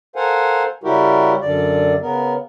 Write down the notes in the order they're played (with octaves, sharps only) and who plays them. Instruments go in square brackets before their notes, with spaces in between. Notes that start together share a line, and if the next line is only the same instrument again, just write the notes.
[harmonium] A4 A#4 C5 F5 F#5 G#5
C#3 G3 E4 F#4 G4 A#4
F#2 D3 D5
C#3 B3 A#4